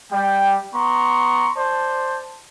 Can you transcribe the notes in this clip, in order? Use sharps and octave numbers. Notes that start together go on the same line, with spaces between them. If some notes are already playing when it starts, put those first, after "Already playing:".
G3 G5
B3 A#5 C6 C#6
C5 D5 A5